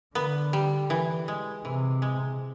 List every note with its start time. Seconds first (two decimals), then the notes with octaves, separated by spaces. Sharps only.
0.15 D3 B3
0.53 G3
0.90 E3
1.28 G#3
1.65 C3 E3
2.02 G#3